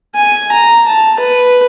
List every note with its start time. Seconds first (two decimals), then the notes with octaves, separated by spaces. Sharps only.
0.15 G#5
0.52 A#5
0.88 A5
1.19 B4